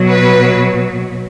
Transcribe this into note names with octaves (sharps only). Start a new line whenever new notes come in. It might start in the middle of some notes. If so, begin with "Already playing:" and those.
Already playing: B2 F#3
B4